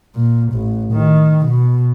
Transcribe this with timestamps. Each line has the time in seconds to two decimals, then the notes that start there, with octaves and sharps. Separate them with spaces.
0.16 A#2
0.53 A1
0.93 D#3
1.46 B2